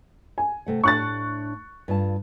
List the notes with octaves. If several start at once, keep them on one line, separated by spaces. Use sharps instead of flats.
G#5
C3 A3 F#5
A2 D4 A5 C#6 F#6 A6
G2 F4 A5